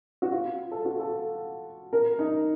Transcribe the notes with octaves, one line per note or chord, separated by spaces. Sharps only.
F#4
F4
A4
F#4
A4
A#4
D#4